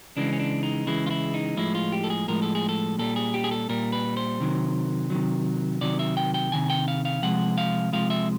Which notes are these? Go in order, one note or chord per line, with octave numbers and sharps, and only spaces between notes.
C#3 E3 G#3 D4
C#4
D4
D#4
C#3 E3 G#3 E4
F4
E4
D#4
A2 F3 G#3 E4
F4
G4
A4
G#4
A2 F3 G#3 A#4
A4
G#4
A4
A#2 G3 A4
G#4
G4
G#4
A4
A#2 G3 A#4
B4
C5
C3 D#3 F#3
C3 D#3 F#3
C3 D#3 F#3 D5
E5
G5
G5
C3 D#3 G#5
G5
F5
F5
C3 F3 G#3 F#5
F5
C3 F3 G#3 F5
E5